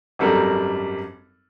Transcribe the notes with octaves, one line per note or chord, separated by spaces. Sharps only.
G#1 F#2 G3 A4 A#4